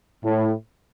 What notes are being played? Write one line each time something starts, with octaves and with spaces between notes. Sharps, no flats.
A2